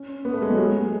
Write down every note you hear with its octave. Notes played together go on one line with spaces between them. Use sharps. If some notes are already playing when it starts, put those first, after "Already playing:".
Already playing: C#4
B3
A3
G#3
F#3
G#3